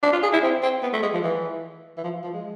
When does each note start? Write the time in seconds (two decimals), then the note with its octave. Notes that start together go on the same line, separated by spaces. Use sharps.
0.03 D4
0.12 F4
0.23 G#4
0.33 E4
0.43 C4
0.63 C4
0.83 B3
0.93 A3
1.03 G#3
1.13 F3
1.23 E3
1.97 E3
2.04 F3
2.24 F3
2.33 G#3